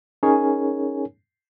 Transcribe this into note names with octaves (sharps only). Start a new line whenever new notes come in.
C#4 D#4 G#4 A#4 C#5 G#5